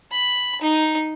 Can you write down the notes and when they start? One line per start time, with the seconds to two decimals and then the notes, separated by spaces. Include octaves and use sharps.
0.11 B5
0.62 D#4